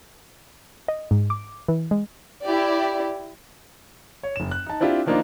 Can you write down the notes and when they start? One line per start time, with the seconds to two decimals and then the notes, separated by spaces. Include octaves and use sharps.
0.88 D#5
1.11 G#2
1.30 D6
1.68 E3
1.91 G#3
2.43 E4 G4 D5
4.23 C#5
4.36 F#1 E7
4.51 F#6
4.66 D#4 A5
4.80 C4 D4 E4 F4 G4 C5
5.06 D#3 F3 A#3 D4 D#4 F4